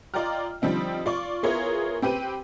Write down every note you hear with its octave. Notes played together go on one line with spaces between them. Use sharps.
F4 D5 D#5 G5 A#5 F6
D3 F3 G3 C4 D#4
F4 D5 C#6
B3 E4 F4 G#4 A#4 C#5
C4 G4 B4 G5 D#7